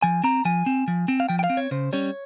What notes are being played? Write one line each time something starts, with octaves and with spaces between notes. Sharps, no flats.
F3 G#5
C4 A#5
F3 G#5
C4
F3
C4
F5
F3 G5
G5
F5
C4
C#5
C#3 C5
G3 C#4 C#5